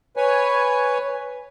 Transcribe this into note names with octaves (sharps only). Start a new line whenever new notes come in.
B4 C#5 G#5